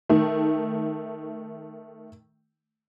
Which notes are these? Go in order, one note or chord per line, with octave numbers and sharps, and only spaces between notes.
D#3 A3